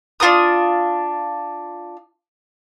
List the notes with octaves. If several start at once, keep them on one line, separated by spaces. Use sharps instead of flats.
D4 F4 A#4 D#6